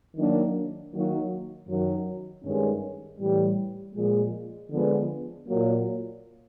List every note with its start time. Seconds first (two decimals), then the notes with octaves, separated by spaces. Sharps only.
0.15 D#3 F#3 A#3 D4
0.91 D#3 F#3 A#3 D#4 F#4
1.67 F#2 D#3 F#3
2.44 G2 D#3 G#3 C#4
3.19 A2 E3 G3
3.95 A#2 F3 G#3
4.71 D3 F3 G#3 B3
5.47 A#2 F#3 A#3